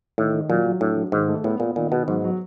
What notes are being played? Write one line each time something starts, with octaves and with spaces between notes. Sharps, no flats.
A2 D#3
D#3
A#2 F#3
F#3
A2 D4
F#3
G#2 D#3
A3
A2 B3
A#2 B3
A#2 D#3
B2 B3
G#2 F#3
F#3